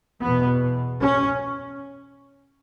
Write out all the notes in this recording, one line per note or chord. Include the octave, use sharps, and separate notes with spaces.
E2 B2 B3
C#4